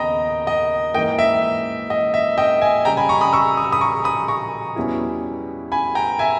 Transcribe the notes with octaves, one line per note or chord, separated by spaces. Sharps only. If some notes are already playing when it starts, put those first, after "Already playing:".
Already playing: D#2 C#3 B3 D#5 G5 A#5 B5
D#5
G#2 E3 A#3 D#5 G5
E5
D#5
E5
D#5 G5
E5 G#5
C#3 G3 C#4 G5 A#5
G#5 B5
A#5 C#6
B5 D#6
C#6 E6
D#6
E6
B5 D#6
A#5 C#6
B5 D#6
A#5 C#6
E2 B2 G3 C#4 E4
G#5 B5
G5 A#5
E5 G#5